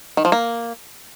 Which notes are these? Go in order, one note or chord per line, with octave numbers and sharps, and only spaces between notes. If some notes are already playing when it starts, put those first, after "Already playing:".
D#3
F3
A#3